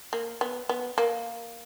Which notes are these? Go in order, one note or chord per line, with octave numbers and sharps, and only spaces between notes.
A#3
B3
B3
A#3